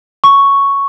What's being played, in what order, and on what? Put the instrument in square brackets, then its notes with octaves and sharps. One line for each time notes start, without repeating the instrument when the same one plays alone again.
[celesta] C#6